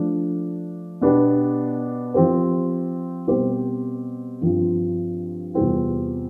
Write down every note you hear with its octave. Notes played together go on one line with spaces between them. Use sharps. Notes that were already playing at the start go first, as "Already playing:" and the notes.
Already playing: F3 A3 D4
B2 B3 D4 G4 B4
F3 C4 G4 C5
B2 G3 C4 G4 C5
G2 F3 C4 F4
E2 C3 G3 C4 F4